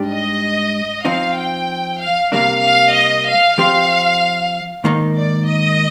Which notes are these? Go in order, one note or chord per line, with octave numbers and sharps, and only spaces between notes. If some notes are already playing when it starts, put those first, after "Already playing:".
Already playing: G#2 G3 D4 G4
D#5
F3 C4 D#4 F5
G5
F5
C3 G3 A#3 D4 F5
F5
D#5
F5
F3 C4 G4 C5 F5
G#2 D#3 A#3 D#4
D5
D#5